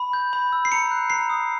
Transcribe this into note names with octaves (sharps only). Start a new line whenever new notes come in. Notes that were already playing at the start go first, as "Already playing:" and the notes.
Already playing: B5
G6
B5
E6
C7
A#5 C#7
F#6
A#5 C7
D#6